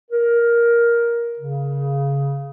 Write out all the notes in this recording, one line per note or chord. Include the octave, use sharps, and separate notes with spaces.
A#4
C#3